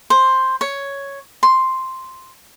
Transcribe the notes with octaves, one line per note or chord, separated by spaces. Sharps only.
C5
C#5
C6